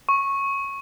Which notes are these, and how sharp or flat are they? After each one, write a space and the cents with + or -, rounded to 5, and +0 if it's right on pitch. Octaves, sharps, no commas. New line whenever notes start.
C#6 -10